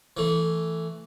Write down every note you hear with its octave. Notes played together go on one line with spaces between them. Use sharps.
E3 A3